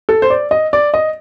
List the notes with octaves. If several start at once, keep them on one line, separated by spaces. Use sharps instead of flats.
A4
C5
D5
D#5
D5
D#5